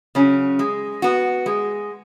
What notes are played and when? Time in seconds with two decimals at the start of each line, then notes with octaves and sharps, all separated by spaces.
0.15 C#3 F#3 C#4
0.59 G#3
1.02 B3 F#4
1.46 G#3